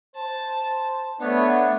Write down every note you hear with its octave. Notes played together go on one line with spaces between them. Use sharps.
C5 A5
A3 B3 D4 C#5